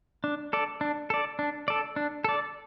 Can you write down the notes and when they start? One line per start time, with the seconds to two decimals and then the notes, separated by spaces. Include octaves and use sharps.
0.24 D4
0.53 A4 D5
0.81 D4
1.10 A4 D5
1.39 D4
1.68 A4 D5
1.96 D4
2.24 A4 D5